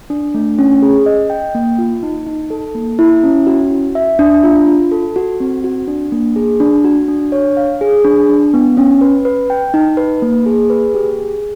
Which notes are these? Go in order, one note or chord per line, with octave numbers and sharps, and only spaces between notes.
D4
A3
C#4
G#4
D#5
G5
A#3
F4
D#4
D#4
A4
A#3
E4
C#4
F#4
F#4
E5
D4
F4
F4
A4
F#4
C4
F#4
D4
A#3
G#4
D4
F#4
D4
C#5
F5
G#4
D4
D4
B3
C#4
B4
B4
G5
D#4
B4
A#3
G#4
B4
G4
G#4